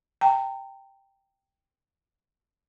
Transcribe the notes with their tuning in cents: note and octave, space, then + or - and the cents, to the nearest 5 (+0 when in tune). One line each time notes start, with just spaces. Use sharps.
G5 +0 A#5 -35